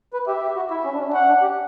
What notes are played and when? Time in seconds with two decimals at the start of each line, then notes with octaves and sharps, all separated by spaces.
0.13 B4
0.27 G4 E5
0.42 G4
0.56 F#4
0.70 E4 E5
0.85 C#4
0.94 D4
0.99 C#4
1.09 D4
1.13 C#4 F#5
1.28 D4
1.42 G4